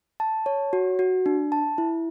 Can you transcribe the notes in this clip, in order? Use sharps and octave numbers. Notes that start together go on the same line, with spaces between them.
A5
C#5
F#4
F#4
D4
A5
E4